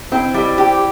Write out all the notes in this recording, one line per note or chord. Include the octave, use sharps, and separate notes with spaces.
C4 E4
G3 E4
G4